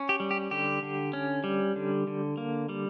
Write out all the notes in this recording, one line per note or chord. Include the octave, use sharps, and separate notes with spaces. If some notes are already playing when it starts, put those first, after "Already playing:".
Already playing: C#4
G4
G3
G4
D3 G4
D3
C#4
G3
D3
D3
A#3
G3